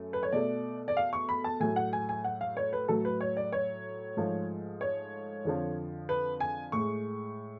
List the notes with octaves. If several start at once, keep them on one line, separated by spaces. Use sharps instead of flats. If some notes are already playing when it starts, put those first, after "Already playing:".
Already playing: F#2 A3
B4
C#5
B2 A3 D5
D5
F5
C#6
B5
A5
A2 F#3 A3 G#5
F#5
G#5
G#5
F#5
F5
C#5
B4
A2 F#3 A3 A4
B4
C#5
D5
C#5
G#2 F3 A3
C#5
F2 D3 F3
B4
G#5
A2 G#3 C#6